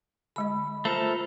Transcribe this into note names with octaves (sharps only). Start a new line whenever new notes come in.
D3 G#3 D#5 B5
A3 F4 A4 A#4 C5